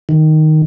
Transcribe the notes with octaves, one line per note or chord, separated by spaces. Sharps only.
D#3